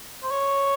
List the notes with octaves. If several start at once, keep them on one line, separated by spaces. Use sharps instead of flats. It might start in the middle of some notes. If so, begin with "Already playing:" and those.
C5
C#5